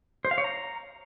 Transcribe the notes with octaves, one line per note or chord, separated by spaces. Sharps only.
C5
F5
C#5
A#5